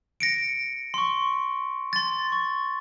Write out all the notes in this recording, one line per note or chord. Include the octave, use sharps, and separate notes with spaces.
A#6 C#7 D7
C6 C#6
C6 A6
C#6